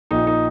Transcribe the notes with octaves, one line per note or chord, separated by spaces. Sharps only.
A#1 A#2 D#4
D#4